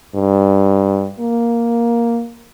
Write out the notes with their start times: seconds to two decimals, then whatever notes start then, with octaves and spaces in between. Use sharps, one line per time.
0.15 G2
1.20 A#3